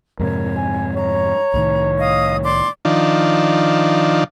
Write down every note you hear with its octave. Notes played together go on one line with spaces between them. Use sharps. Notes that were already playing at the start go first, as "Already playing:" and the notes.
F2 G#2 C3 A#4 C#5
G#5
C#5 A#5
C2 A2 D#3
D#5 F5 D#6
D5 C6 D6
D#3 F3 D4